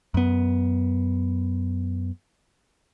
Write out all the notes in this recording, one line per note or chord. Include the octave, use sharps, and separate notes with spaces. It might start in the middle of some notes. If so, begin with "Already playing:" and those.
F#2 B3